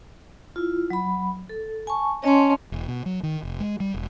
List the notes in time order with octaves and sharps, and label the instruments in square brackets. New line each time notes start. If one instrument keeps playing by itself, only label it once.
[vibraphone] E4 F4
F#3 B5
A4
G#5 A5 C#6
[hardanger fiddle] C#4 [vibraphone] D#5 A5 C6
[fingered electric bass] E1
B2
F#3
D#3
F1
G#3
G3
E1